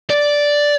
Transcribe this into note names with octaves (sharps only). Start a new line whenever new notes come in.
D5